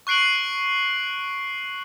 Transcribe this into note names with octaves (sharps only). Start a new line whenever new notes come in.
C#6 F#6 C7 D7 F#7